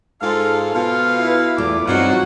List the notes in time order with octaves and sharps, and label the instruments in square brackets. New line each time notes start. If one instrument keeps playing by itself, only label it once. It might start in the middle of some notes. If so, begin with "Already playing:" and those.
[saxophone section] G#2 F5 [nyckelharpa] F4 A4
[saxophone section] B2 F5 [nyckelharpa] F4
[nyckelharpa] E4 B4
[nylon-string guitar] E2 A3 F4 [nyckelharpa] D6
[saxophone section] E2 F#3 F4 [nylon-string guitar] G2 C4 D#4 [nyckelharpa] F#4 F#5